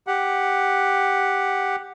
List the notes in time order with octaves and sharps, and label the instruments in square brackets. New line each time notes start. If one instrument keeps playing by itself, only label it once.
[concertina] G4 F#5